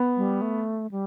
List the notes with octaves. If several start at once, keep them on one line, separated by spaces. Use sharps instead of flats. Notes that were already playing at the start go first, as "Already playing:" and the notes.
Already playing: B3
G3
A3
G3